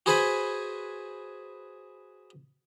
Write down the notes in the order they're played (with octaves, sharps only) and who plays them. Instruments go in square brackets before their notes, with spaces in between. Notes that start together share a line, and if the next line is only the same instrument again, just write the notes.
[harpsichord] F#4 G#4 B4 C5 G#5 B5